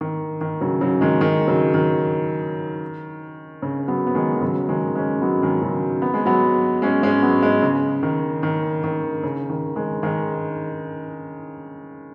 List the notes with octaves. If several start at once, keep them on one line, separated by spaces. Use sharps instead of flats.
D#3
D#3
C#3 F#3
C#3 F#3
D#3 G#3
D#3 G#3
C#3 F#3
D#3
C#3
F#3 B3
B3
D#3 G#3
D#3
C#3 F#3
D#3 G#3
G#3 C#4
F#3 B3
D#3 G#3
C#3 F#3
B3
G#3
F#3 B3
G#3 C#4
G#3 C#4
F#3 B3
G#3 C#4
C#3
D#3
D#3
D#3
C#3
D#3
D#3 G#3
D#3 G#3